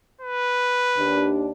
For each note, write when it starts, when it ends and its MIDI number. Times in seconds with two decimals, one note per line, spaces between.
0.21 1.31 71
0.97 1.52 39
0.97 1.52 62
0.97 1.52 67